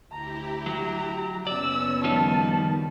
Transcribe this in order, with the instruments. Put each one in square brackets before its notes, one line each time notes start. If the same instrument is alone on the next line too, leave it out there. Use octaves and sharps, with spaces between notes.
[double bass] D2 [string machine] E4 G4 [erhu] A#5
[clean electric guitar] F#3 [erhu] A#5
[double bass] F#1 B3 [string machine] C#4 [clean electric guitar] D5 [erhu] E6
[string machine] D#3 [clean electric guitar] F3 G3 D#4 [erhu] A5